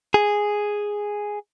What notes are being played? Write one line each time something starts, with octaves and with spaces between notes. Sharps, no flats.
G#4